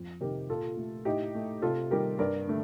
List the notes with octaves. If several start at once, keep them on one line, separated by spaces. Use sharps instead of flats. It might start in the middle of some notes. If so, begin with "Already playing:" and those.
Already playing: F2
C3 D#3 G4 A#4
A#2 F4 A4
A3
A2 D#4 G4
A3
C3 F4 A4
D#3 G3 A#3 G4 A#4
G2 A#4 D5
D3 A3